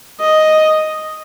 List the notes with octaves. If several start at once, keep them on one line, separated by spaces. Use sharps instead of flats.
D#5